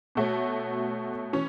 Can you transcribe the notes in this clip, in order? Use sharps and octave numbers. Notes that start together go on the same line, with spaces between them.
B2 A3 F#4 C#5
E3 C#4